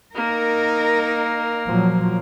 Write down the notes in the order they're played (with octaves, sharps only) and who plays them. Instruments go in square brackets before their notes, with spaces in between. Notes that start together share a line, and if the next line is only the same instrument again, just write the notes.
[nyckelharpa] A#3 [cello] D#4 A#4
[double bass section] A#2 F3 F#3